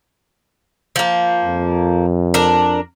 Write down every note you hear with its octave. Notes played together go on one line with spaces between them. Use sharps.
F3 A#3
F2
D4 A#4